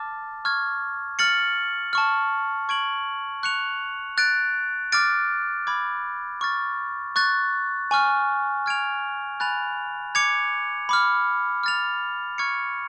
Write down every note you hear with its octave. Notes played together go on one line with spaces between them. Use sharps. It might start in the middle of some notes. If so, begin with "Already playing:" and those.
Already playing: A5 D6 F6 A6
C#6 F6 G#6
F6 A6 C#7 F#7
A5 C#6 F6
C#6 G#6 D7 F#7
C#6 F#6 C#7 F7
F#6 A6 D7
D6 F6 A6 D7
B5 D6 G#6
C#6 F6 A6
C#6 F#6 A6
G#5 C#6 F6
F6 G#6 D7 F7
G#5 B5 F#6 A6 F7
D6 G#6 C#7 F7
B5 D6 F6
F6 A6 F7
C#6 F6 G#6 C#7